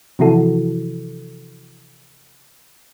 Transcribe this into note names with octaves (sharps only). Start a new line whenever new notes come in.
C3 E3 F3 E4 F#4 A4